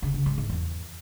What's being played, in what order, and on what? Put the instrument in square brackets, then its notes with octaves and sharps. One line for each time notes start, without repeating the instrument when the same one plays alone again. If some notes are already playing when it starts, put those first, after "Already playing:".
[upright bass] C#3
C#3
G#2
G#2
E2